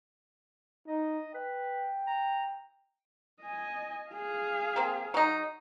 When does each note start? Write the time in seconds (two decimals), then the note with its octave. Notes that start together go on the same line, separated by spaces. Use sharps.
0.87 D#4 D#5
1.34 B4 G5
2.07 A#5
3.42 D#5 G#5
4.10 G#4 F5
4.76 A#3 C4
5.14 F#3 D#4